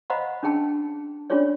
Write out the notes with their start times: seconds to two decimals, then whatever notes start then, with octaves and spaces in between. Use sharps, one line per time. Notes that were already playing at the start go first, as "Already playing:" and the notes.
0.10 C5 D#5 F5 F#5 A#5 B5
0.43 C#4 D4 G#4 G5 A5
1.30 C#4 D4 F4 G#4 C#5 D5